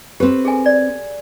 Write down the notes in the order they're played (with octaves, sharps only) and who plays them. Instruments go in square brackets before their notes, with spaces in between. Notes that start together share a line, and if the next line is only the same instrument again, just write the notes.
[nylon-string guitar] C4 B4 [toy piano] G4
[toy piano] G#4 A4 G#5
D5